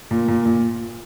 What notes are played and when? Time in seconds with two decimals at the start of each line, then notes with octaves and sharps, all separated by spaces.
0.11 A#2
0.28 A#2
0.46 A#2